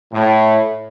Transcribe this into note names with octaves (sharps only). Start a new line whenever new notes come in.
A2